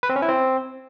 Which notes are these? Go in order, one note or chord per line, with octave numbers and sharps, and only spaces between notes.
B4
C4
C#4
E4
C4